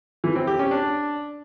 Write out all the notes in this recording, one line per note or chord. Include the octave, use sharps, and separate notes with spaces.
E3
C4
G4
C#4
D4